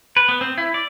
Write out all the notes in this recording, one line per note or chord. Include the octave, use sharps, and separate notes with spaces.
B4
B3
C4
E4
D5